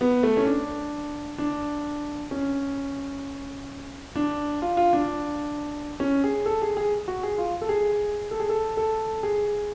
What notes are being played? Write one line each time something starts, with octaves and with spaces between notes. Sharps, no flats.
B3
A3
C#4
D4
D4
C#4
D4
F4
F4
D4
C#4
G#4
A4
G#4
G#4
F#4
G#4
F4
A4
G#4
A4
G#4
A4
A4
G#4